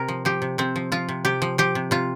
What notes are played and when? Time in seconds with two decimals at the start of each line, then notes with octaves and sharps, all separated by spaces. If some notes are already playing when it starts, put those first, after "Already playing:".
Already playing: C3 A#4
0.08 F3
0.25 F3 G4
0.42 C3
0.58 C3 C4
0.76 F3
0.92 F3 F4
1.09 C3
1.25 C3 G4
1.42 F3
1.58 F3 G4
1.75 C3
1.91 C3 F4